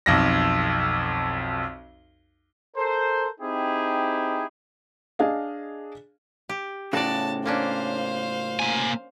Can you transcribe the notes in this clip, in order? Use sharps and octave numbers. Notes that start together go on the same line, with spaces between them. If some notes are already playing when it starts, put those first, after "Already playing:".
B1 F2 A#6
A4 A#4 C5
C4 D#4 E4 G4 G#4
D4 G#4 D#5 F5
G4
A2 C#3 F#4 D5 A5
A#3 C#4 D4 C5 F5
A#3 G#5